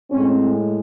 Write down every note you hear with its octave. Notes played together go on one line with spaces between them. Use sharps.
A2 G#3 C4 C#4